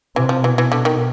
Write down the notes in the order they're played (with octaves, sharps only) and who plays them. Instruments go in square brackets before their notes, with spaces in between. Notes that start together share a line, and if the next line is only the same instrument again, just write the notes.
[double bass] C3 [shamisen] E3
[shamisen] F3
[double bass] B2 [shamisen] E3
[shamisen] E3
D3
D#3